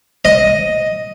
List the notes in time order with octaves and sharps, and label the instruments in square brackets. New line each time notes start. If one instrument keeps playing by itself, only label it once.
[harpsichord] D#5